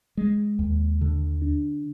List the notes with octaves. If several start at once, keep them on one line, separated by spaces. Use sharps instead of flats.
G#3
D#2
D3
D4